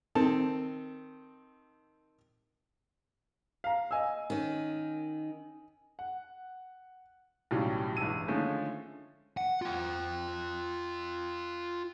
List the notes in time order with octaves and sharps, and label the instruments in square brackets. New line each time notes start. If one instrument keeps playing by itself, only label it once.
[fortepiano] D#3 C4 A4 A5
[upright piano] F5 A#5
D#5 G#5 E6
[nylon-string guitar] D#3 C#4
[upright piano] F#5
B1 A2 C#3 F#3 G3
A1 G2 G#3 E6 D#7
D3 D#3 F3 G#3 A3 C#4
[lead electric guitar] F#5
F4 G5